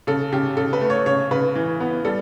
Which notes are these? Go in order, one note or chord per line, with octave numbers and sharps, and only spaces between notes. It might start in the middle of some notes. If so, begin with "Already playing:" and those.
C#3 A4
C#3 G4
C#3 A4
B4
A3
C#5
C#3 C#5
C#3 B4
E3
B3
G3 A4